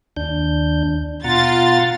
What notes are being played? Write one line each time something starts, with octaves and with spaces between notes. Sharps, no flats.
D#2 D4 G6
B2 F4 F#5 A#5 A6